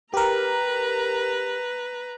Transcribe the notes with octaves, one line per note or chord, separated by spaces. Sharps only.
G4 A#4 B4 A#5